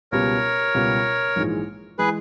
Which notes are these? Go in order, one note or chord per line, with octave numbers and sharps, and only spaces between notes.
C#2 B2 G3 B3 G4 A#4 C#5
C#2 B2 G3 B3 G4
A#1 G#2 E3 G#3
E3 G#3 G#4 B4